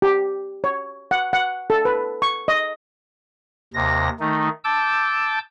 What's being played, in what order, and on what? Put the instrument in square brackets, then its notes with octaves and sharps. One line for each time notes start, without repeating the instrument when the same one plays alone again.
[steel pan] G4
C#5
F#5
F#5
A4
B4
C#6
D#5
[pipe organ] D#2 C3 A#6
D#3 A3 D#4
A5 D6 E6 G6